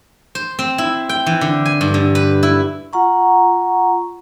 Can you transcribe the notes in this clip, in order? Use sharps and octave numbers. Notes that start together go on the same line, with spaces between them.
C5
C4
E4
G5
E3
D3
G#5
G2
D3
B4
E4
F4 F#5 A#5 C#6